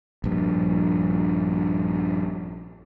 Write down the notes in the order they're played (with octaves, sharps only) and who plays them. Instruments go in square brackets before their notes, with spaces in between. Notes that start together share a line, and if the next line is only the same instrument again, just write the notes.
[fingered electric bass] A#1 G2